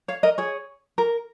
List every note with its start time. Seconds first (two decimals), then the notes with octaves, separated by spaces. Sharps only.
0.08 C#5 F5
0.23 A#4 D#5
0.38 G#4 C#5
0.98 A#4